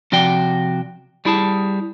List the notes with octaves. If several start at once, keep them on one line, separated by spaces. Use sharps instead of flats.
C3 F3 F#4 D5 G5
G3 E4 G#4 A5